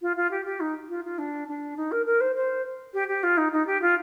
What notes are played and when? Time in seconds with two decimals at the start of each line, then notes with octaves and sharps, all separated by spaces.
0.01 F4
0.16 F4
0.30 G4
0.45 G4
0.60 D#4
0.89 F4
1.04 F4
1.18 D4
1.47 D4
1.76 D#4
1.91 A#4
2.05 A#4
2.20 C5
2.35 C5
2.93 G4
3.07 G4
3.23 F4
3.37 D#4
3.52 D#4
3.66 G4
3.81 F4